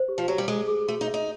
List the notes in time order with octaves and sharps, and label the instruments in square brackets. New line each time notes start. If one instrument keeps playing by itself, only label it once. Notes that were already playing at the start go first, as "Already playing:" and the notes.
Already playing: [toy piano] C5
G4
[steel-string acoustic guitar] F3
[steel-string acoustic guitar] F#3 [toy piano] G4
[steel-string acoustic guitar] G3
[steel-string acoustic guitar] G#3 [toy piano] G#4
[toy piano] G#4
[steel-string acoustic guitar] A3 [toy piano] F#4
[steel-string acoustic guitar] D#4
[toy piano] E5
[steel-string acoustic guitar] D#4